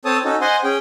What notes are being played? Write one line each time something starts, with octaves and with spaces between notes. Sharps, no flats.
C4 A4 C#5 A5 D#6
C#4 D#4 F#4 A4
C5 D#5 F#5 G#5 C6
C#4 G#4 G5